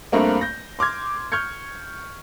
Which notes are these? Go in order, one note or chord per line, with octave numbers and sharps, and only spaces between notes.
G2 A3 A#3 C4
G6 A#6
C6 D6 F6 G#6
C#6 F6 G6 G#6 C#7